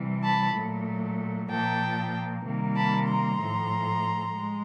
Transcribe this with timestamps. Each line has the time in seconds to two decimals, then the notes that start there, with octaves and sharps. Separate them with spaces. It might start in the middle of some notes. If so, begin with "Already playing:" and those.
Already playing: C3 E3 G3
0.23 A5 B5
0.55 A#2 F#3 A3
1.49 A#2 F3 A#3 G5 A5
2.45 C3 D#3 G3 A#3
2.75 A5 B5
3.07 A#5 C6
3.39 A2 F3 A3
4.33 G#3